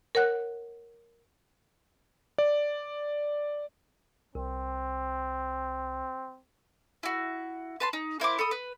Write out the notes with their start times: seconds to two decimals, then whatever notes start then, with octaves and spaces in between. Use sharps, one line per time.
0.15 A#4 C#5 F#5 F#6
2.38 D5
4.35 C2 C4
7.03 E4 F#4
7.80 B4 A5 C6
7.93 D#4
8.20 A#3 E4 C5 D6
8.39 A4 B5 D#6
8.51 B4